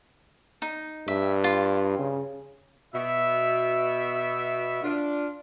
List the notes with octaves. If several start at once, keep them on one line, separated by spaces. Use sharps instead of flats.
D#4
G2 E5
F4
C#3
B2 E5
D4 F4